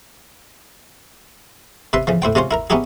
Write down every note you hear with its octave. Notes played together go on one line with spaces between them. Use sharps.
C3 B4 E5 C6
C#3 E3 F3
A2 E4 C5 G5
C3 G#3 C#4 F4 C5
E4 A#4 A#5
B3 C#4 D#4 E4 G4 G#4